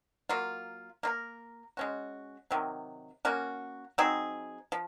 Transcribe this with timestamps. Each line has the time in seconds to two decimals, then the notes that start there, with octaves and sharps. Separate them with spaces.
0.29 F#3 A#3 F4
1.03 A#3 F4 A#4
1.77 G#3 C#4 F#4
2.51 C3 D#3 F#3
3.25 A#3 C#4 F#4
3.98 F#3 C4 D#4 G#4
4.72 F3